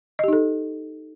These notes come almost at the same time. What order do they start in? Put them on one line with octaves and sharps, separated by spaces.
D#5 G4 D#4 A4